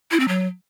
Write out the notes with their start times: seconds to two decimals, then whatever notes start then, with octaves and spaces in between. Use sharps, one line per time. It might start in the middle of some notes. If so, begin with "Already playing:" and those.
0.11 E4
0.20 C4
0.28 F#3